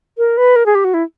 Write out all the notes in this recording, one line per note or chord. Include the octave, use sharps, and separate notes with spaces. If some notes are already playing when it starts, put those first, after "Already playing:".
A#4
B4
A#4
G#4
G4
F#4
E4